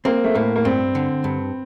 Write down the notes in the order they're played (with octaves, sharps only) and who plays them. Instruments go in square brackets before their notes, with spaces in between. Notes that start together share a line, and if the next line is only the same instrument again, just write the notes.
[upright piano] A#3 [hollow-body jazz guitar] C4
[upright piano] A3
[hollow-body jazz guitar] A2 [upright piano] A#3
[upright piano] A#3
[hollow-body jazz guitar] G2 [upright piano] C4
[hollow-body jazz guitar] D3
G2